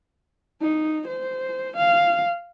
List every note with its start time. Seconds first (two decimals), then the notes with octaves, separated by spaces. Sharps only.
0.61 D#4
1.07 C5
1.76 F5